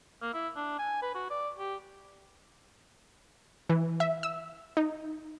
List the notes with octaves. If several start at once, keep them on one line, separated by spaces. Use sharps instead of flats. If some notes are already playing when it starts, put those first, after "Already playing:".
A#3
E4
D4
G#5
B4
F#4
D5
G4
E3
E5
E6
D#4